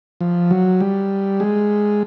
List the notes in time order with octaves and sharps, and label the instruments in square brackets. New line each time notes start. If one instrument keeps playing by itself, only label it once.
[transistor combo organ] F3
F#3
G3
G#3